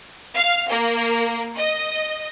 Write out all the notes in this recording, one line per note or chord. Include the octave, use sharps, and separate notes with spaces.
F5
A#3
D#5